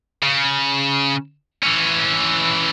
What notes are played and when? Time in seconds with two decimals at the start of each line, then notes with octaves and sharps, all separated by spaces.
0.23 C#3
1.63 E3 C#4